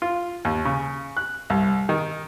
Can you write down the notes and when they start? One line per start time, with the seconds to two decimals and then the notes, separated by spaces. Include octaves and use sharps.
0.02 F4
0.45 D#2
0.65 C#3
1.17 F#6
1.50 C2
1.89 D#3